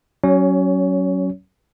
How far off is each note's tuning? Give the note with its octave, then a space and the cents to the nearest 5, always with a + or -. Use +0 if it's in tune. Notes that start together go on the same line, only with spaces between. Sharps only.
F#3 +20 C#4 +0 C#5 +25